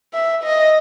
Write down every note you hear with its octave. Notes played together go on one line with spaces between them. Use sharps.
E5
D#5